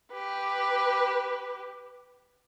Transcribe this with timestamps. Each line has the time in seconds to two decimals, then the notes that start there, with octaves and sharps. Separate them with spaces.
0.12 G4 B4